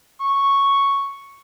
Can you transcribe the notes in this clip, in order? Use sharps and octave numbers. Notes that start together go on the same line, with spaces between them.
C#6